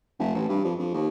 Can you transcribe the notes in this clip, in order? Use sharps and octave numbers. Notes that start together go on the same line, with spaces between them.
F1
A1
G2
F2
F2
D#2